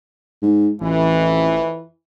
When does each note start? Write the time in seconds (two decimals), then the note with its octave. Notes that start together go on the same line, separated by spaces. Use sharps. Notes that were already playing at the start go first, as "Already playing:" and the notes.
0.42 G#2
0.81 A1 F2 E3